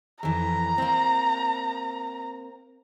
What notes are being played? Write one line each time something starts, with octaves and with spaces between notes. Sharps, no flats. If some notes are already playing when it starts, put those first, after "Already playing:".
F2 E3 A#5
A#3 C4